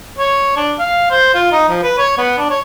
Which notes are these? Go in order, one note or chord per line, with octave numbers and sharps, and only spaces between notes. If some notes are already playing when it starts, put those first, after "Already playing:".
C#5
D4
F5
C5
F4
D#4
F3
B4
C#5
B3
D4
C#5